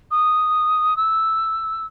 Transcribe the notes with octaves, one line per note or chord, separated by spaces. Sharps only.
D#6
E6